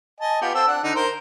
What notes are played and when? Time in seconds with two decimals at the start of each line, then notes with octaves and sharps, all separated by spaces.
0.20 D#5 G#5 A5
0.42 B3 F4 G4
0.54 C4 A4 E6
0.67 D4 F#5
0.83 D3 D#4
0.95 A#4 C5